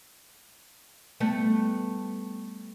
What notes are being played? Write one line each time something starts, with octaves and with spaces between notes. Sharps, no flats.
G3 A3 B3